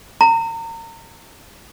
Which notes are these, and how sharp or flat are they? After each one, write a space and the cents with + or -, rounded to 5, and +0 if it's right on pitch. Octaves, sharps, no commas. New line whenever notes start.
A#5 -35